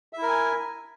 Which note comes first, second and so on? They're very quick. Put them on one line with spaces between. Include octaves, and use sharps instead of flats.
E5 E4 A#4 G#5